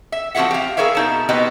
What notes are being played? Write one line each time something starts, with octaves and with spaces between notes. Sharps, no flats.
E5
F3 C4 F#4 G#4 E5 F#5
G4 F5
G#4 A#4 B4 C#5 E5 F5
B2 D#4 A5
B2 B3 C4 G4 B4 D#5